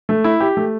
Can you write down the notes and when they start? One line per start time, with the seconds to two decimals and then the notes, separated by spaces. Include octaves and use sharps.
0.09 A3
0.24 E4
0.40 G4
0.57 A3